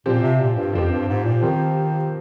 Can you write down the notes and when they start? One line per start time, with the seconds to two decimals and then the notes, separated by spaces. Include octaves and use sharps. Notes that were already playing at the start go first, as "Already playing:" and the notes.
0.06 A#2 F3 C4 G4
0.22 C3
0.40 A#2
0.56 G2
0.73 F2 F3 C4 G4
0.90 G2
1.08 G#2
1.25 A#2
1.41 D#3 F3 C4 G4